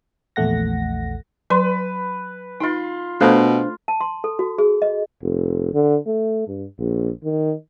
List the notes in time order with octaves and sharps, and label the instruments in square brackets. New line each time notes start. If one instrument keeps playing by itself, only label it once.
[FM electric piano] A#1 E2 A3 F#5 A#6
[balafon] F#3 D5 C6 [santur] B4
[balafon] D#4 [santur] F4 B5 C6
[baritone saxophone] B2 [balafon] A3 A4 [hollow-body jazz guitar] D4 C5 F5
[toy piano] A5
C6
A4
F#4
G#4
D#5
[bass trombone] F1
D3
A3
G2
A#1
D#3